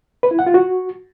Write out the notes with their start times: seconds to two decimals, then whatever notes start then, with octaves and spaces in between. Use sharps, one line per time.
0.23 B4
0.31 E4
0.39 F#5
0.46 F4
0.54 F#4